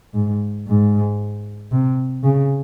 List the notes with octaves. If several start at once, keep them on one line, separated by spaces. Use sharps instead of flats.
G#2
G#2
C3
C#3